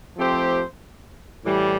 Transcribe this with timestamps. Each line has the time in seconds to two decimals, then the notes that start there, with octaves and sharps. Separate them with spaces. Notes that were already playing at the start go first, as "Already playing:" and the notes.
0.16 F3 A3 C4 G4 C5
1.45 A2 E3 G3